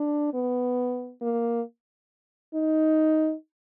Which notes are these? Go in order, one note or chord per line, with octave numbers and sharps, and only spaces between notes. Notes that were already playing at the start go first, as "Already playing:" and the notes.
Already playing: D4
B3
A#3
D#4